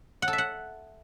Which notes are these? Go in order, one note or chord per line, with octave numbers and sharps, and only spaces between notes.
F#5
A4
E5
F#5